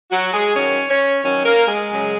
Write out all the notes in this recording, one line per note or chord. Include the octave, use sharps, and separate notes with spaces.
F#3 F#4
G#3 G#4
F#2 D#3 F#3 C#4 C#5
C#4 C#5
F#2 D#3 F#3 C#4 C#5
A#3 A#4
G#3 G#4
F#2 C#3 F#3